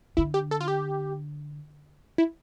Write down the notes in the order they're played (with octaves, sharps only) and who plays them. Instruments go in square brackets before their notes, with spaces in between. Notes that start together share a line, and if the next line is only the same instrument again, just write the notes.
[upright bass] D3 [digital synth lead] E4
[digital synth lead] G4
A4
F4
G4
E4